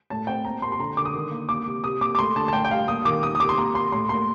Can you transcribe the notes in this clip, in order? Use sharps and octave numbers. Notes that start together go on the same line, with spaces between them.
A2 A5
C4 G5
A#3 A#5
A#3 C6
C6
D3 A#5
D3 D6
D#6
D#3
A#3
A#3 D6
C3
C3 D#6
A#3 D6
D6
A3 C6
D3 A5
A5
A2 G5
G5
G3 F5
A#3 D#6
D#3 D6
A#3 D#6
D#6
C3 D6
C6
A#3 A#5
A#3 C6
A2 C6
A#3 C6